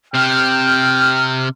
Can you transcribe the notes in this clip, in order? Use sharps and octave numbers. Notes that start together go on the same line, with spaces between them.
C3 G5 F6